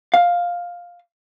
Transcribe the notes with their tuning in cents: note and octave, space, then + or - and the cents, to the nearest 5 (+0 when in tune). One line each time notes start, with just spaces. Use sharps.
F5 +10